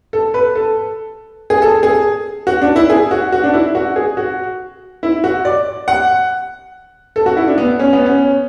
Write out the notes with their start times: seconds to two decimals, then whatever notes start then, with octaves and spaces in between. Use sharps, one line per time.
0.13 A4
0.34 B4
0.55 A4
1.50 G#4
1.62 A4
1.83 G#4
2.47 F#4
2.62 D4
2.76 E4
2.90 G#4
3.11 F#4
3.32 F#4
3.43 D4
3.53 E4
3.75 F#4
3.96 G#4
4.17 F#4
5.03 E4
5.24 F#4
5.45 D5
5.88 F#5
7.16 A4
7.26 F#4
7.37 E4
7.47 D4
7.58 B3
7.80 C#4
7.93 B3
8.06 C#4